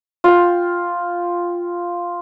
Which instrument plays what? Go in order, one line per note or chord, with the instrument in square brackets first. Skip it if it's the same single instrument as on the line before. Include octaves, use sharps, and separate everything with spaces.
[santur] F4 G5